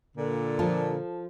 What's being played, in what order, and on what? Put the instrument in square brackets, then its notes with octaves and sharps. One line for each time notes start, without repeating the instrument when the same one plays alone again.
[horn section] A#2 D3
[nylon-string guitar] F3 F4 A4